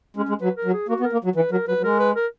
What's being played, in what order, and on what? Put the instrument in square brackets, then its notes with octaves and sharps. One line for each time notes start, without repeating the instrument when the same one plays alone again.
[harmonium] G#3 [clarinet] C#4
[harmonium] G#3
[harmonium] F#3 [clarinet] B4
[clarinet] A#4
[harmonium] F#3
[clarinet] G#4
[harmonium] A#3 [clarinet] F#4
[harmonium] B3
[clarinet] A#4
[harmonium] A#3
F#3
[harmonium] E3 [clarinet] B4
[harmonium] F#3 [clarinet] A#4
[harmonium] F#3 [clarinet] B4
[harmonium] F#3
[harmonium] G#3 [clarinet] A#4
[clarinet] B4
A#4